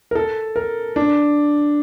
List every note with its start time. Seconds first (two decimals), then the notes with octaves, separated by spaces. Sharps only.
0.11 A#4
0.15 A4
0.56 A#4
0.96 D4